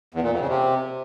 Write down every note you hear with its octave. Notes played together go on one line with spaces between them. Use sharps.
E2
A#2
F2
C#3
C3